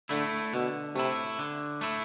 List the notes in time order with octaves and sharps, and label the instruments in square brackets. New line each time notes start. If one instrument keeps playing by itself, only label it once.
[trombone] D3 [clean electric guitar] A3 E4
[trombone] B2 [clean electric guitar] D3
[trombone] C3 [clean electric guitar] A3 E4
[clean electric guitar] D3
A3 E4